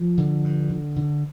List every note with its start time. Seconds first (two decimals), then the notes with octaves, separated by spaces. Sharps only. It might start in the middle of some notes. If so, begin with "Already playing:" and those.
Already playing: F3
0.18 D3
0.44 G2
0.69 D3
0.96 D3